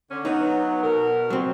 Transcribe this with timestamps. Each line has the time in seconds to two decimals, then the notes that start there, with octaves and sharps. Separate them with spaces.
0.10 D3 C#4
0.25 F#3 B3 D#4
0.82 B2 A#4
1.30 F#3 C4